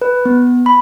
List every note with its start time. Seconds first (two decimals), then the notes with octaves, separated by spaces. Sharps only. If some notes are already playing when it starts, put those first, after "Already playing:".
0.02 B4
0.25 B3
0.66 B5